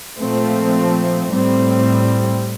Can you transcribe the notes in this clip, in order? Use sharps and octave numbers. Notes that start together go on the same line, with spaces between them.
A#2 F3 A3 C4
A2 G3 C4